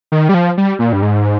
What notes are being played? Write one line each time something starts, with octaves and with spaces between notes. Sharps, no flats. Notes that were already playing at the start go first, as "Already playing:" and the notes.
D#3
G3
F3
G3
A#2
G2
G#2